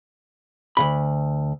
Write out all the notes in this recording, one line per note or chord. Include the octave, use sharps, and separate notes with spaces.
D2 G#2 B5